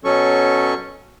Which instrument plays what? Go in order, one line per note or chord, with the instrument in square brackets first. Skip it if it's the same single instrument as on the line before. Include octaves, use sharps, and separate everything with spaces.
[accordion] B2 F#3 C#4 A4 C#6